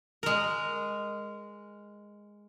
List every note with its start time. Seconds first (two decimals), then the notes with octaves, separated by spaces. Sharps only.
0.23 G#3 A#4